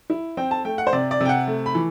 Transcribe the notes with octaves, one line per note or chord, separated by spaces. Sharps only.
E4
C4 G5
A5
A3 G5
F#5
C5
C3 D5
D5
C3 G5
F#5
A3
B5
E3